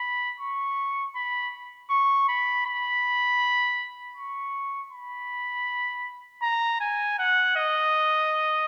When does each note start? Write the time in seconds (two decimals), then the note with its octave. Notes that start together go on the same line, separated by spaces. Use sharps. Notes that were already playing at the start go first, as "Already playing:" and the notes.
Already playing: B5
0.40 C#6
1.16 B5
1.90 C#6
2.28 B5
2.66 B5
4.17 C#6
4.92 B5
6.42 A#5
6.81 G#5
7.19 F#5
7.56 D#5